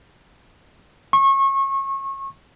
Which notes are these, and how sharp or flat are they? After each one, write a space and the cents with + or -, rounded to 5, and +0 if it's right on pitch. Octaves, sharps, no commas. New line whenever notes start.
C#6 -30